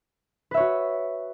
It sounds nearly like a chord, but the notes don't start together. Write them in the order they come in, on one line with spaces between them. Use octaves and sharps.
B4 E5 C#5 F#4